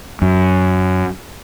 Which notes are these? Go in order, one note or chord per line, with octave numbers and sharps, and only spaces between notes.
F#2